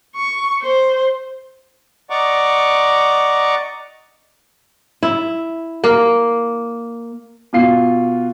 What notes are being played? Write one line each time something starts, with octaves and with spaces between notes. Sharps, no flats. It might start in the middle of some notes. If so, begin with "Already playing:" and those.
C#6
C5
D5 D#5 F#5 A#5 C#6 D6
E4
A#3
B2 F4 C7